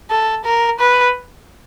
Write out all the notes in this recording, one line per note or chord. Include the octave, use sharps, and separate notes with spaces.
A4
A#4
B4